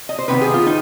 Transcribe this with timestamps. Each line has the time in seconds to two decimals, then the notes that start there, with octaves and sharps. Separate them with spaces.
0.09 D#5
0.19 C5
0.28 C3 D#3 B3 B4
0.41 G#4
0.54 F4
0.66 D#4